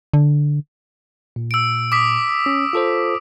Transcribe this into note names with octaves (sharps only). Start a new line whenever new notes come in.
D3
A#2
E6 D7
D6 D#6 B6
C#4
F4 A4 C5